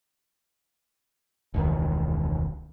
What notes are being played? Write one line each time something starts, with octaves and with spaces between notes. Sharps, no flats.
E1 C#2 D#3